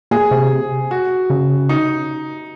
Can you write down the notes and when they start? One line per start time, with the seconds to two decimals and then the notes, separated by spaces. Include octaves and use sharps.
0.11 A#2 G#4
0.31 C3
0.91 F#4
1.30 C#3
1.69 D#4